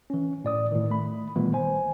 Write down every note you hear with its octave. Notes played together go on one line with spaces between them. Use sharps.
E3 C#4
A2 D5 D#6
A2 D#3
A3 B5
A#2 D#3 E3 G3 A3 B3
A1 C5 G#5